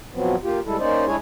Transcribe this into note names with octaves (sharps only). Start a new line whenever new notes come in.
B2 F3 F#3 B3 C4
A#3 F4 G4
D2 G3 G#3 E4 A4
A#3 C#4 D#4 C5 D5 D#5
G#3 D4 E4 G#4 C#5 G#5